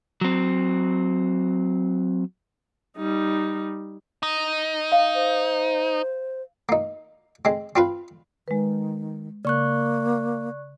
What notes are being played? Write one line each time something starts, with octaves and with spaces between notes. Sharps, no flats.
F#3 C4
G3 D#4
D#4
F5
C5
A#3 D#4
G#3 C4
C4 F4 B4
D#3 G#3 B4
C#3 A#3 D5 C#6 F#6